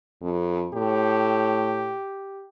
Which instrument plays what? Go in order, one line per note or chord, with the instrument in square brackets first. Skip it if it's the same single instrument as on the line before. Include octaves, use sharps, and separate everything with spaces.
[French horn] F2
[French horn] A2 [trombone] G4